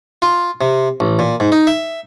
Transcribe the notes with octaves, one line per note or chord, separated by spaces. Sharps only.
F4
C3
A1
A#2
G#2
D#4
E5